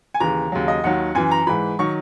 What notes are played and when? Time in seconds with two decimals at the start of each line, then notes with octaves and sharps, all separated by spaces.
0.14 G#5
0.20 D#2 C#3 E3 A#5
0.52 D#2 C#3 F#3
0.68 D#5
0.84 D#2 D#3 F#3 F#5
1.15 F#2 E3 G#5
1.31 A#5
1.47 G#2 E3 B5
1.79 D#3 F#3 C#6